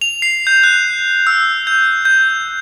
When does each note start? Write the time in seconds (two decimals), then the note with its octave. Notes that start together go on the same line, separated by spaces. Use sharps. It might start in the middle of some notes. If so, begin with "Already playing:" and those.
0.01 F7
0.22 C7
0.47 G6
0.64 F#6
1.27 E6
1.67 G6
2.05 G6